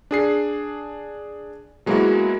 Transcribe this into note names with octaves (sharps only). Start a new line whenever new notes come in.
D4 G#4 C7
F#3 G#3 A#3 B3 E4 F#4